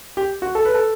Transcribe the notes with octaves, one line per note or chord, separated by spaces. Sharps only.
G4
F#4
A4
B4
A4